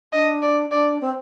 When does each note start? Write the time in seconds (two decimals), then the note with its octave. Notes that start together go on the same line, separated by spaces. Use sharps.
0.13 D4 D#5
0.42 D5
0.71 D4 D5
1.01 C4